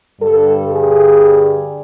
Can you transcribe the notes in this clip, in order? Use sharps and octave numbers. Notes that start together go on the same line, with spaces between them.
G2 D3 G3 A4
G#4